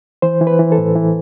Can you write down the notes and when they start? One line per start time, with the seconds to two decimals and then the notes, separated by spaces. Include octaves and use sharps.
0.22 E3 C5
0.41 E3
0.47 B4
0.59 E3
0.72 A4
0.78 A2
0.96 E3